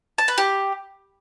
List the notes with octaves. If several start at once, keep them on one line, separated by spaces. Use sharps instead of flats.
A5
B4
G4